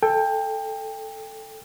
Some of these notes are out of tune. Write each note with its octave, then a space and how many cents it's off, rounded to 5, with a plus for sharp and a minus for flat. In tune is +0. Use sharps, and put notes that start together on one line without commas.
A4 +0 G5 +25